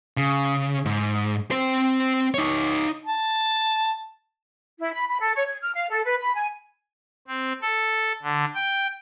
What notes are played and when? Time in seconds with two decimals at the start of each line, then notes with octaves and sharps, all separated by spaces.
0.17 C#3
0.85 G#2
1.51 C4 C5
2.34 D#4 C#5
3.06 A5
4.79 E4
4.93 B5
5.09 B5
5.20 A4
5.35 C#5
5.47 G#6
5.62 F6
5.75 F5
5.90 A4
6.05 B4
6.19 B5
6.36 G#5
7.27 C4
7.62 A4
8.22 D3
8.55 G5